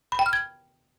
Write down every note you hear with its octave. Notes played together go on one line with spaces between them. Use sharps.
B5
G5
F6
G#6